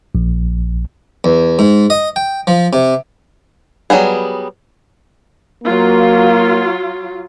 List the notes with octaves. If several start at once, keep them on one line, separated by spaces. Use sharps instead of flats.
A#1
E2
G#2
D#5
G5
F3
C3
F#3 G3 B3 G#4
F#3 A#3 F4